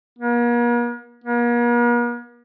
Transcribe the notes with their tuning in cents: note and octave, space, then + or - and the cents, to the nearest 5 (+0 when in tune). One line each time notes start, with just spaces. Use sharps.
A#3 +45
A#3 +45